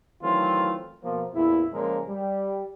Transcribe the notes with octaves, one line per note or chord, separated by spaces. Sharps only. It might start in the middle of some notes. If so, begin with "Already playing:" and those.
D#3 E3 F#3 A3 C4 F4
B2 F3 A#3
A1 E2 A#2 E4
A#2 C#3 F3 G#3 G#4 A#4
G3